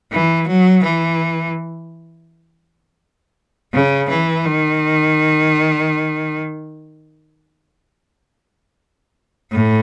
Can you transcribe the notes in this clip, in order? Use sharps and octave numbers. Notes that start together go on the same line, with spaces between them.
E3
F#3
E3
C#3
E3
D#3
A2